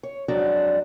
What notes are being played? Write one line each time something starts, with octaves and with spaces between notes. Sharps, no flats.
C#5
F2 F#3 G#3 D4 F#4 D5